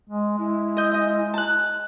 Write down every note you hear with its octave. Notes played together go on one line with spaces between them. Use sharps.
G#3
G#3 E4
D#5 G6
D#5
A5 F#6